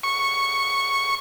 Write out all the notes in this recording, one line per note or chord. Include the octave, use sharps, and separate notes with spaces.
C#6